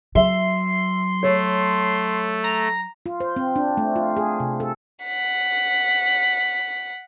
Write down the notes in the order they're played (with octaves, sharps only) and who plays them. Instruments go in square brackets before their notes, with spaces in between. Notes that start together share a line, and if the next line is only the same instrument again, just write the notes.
[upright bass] F#3 [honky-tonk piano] E5 [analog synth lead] C6
[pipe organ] A3 [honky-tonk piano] C#5
[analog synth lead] A#5
[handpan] F4
C5
C4
D4
A3
F4
G#4
C3
A4
[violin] F#5 B6